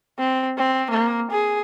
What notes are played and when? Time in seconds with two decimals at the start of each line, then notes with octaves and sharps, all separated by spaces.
0.19 C4
0.58 C4
0.90 A#3
1.31 G#4